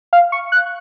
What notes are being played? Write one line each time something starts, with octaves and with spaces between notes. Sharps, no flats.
F5
C#6
F#6